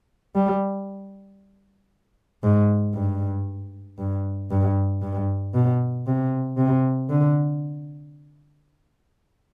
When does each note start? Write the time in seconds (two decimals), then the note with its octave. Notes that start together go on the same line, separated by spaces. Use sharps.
0.35 G3
2.44 G#2
2.95 G2
3.98 G2
4.51 G2
5.02 G2
5.54 B2
6.07 C3
6.57 C3
7.10 D3